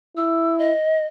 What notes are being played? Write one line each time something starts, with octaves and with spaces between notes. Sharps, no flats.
E4 E6
D#5